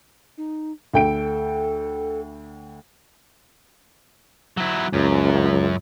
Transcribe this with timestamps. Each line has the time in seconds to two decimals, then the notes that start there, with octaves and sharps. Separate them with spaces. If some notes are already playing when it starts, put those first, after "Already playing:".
0.38 D#4
0.94 D2 A4 G5 D7
4.57 F#3 E4
4.93 C#2 F#2